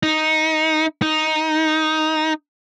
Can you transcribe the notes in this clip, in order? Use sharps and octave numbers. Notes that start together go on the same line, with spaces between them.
D#4
D#4